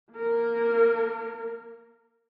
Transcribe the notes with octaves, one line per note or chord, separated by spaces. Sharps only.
A#3 A#4